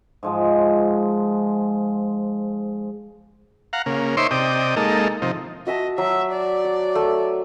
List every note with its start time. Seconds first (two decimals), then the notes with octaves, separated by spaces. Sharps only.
0.23 G#2 F3 G#3
3.73 F5 F#5 A#5
3.86 C#3 A#3
4.17 D#4 C5 C#5 E5 C6 D6
4.31 C3 D5 D#5 G5
4.76 G#3 A#3 D#4 A4
5.22 C3 F3 D#4
5.67 F#4 D#5 E5 A5
5.98 F#3 E5
6.32 D5
6.64 F#5
6.95 A3